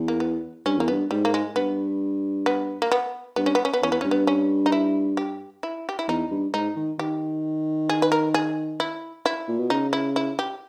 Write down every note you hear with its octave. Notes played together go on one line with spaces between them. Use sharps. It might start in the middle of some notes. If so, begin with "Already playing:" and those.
Already playing: E2
A#3
B3
G2 C#4
E2 A#3
G2 B3
G#2 G3
A#3
G#3
G2 B3
B3
A#3
B3
G2 B3
C#4
B3
C#4
B3
E2 C#4
B3
G2 C#4
B3
C#4
D#4
E4
G4
E4
G4
E4
E2 D#4
G2
G#2 D#4
D#3
D#3 G4
G#4
B4
A#4
G#4
E4
E4
A#2
B2
C#3 D#4
E4
E4
G4